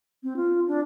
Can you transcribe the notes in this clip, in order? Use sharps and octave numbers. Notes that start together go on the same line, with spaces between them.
C4
F4
D4